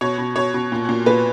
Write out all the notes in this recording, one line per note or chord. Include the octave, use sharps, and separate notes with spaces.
B2 C#5
B2
B2 C#5
B2
A#2
A#2
A#2 B4